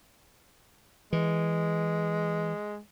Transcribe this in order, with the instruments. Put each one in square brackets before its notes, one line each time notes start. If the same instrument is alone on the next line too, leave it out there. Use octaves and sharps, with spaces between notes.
[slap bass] E3 [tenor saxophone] G#3